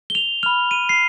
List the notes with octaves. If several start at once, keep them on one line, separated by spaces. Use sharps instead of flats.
G7
F7
B5 F6 F7
D#7
C7